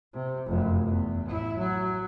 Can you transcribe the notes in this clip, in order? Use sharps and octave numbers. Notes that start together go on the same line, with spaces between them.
C3
F1 F#2
E2
A1 E4
F#3